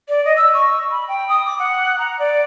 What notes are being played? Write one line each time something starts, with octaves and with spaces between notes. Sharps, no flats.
D5
D#5
E6
C#6
B5
G5
D#6
D6
F#5
A#5
D5